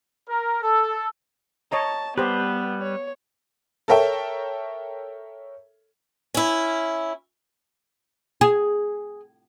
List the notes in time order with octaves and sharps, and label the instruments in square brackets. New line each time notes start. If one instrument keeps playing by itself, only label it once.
[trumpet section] A#4
A4
[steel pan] C#5 D#5 A#5 [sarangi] A5
[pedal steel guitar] G3 B4 [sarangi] B3 [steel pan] G4 C5
[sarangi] C#5
[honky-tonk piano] A4 A#4 C#5 E5 G5
[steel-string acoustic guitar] C#4 E4
[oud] G#4